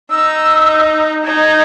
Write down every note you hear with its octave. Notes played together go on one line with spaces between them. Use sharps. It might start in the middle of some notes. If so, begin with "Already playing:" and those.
D#4 E6
D#4 G#6